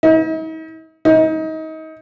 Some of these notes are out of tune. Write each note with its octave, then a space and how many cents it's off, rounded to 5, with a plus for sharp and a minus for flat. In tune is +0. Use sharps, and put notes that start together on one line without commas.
D#4 +45
D#4 +30